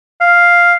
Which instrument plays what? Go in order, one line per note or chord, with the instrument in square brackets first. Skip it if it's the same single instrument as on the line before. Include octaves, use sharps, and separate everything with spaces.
[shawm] F5